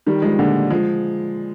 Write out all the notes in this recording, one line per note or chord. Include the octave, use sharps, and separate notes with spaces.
D#3 G3
F3 G#3
A#2 D3
F3 G#3